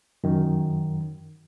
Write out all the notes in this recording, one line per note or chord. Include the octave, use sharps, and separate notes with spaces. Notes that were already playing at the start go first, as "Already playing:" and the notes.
F#2 D#3